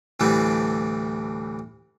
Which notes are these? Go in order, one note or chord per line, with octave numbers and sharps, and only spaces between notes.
D2 A2 E3 G3 C4